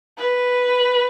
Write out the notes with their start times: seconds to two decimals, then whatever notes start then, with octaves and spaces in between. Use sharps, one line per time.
0.19 B4